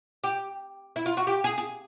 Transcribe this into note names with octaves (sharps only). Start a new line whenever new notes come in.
G4
E4
F4
F#4
G4
G#4
G#4